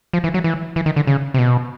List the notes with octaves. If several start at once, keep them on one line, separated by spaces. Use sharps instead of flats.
F3
E3
F#3
E3
E3
D#3
D3
C#3
C3
B2